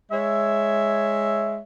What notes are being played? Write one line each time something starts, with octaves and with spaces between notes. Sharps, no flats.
G#3 C#5 E5